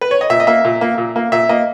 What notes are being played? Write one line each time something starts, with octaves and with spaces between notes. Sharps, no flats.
B4
C#5
D#5
A#2 E5
D#5
A#3 E5
A#2
A#3
A#2
A#3
A#2 E5
A#3 D#5